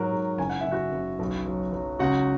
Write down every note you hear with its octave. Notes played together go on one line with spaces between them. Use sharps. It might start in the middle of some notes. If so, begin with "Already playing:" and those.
Already playing: G#2 F#3 A#4
G#2
F#1 G#5
F#5
F#1 E5
F#4 F#5
F#1
B1
F#3
F#3
C#2 F#4 F#5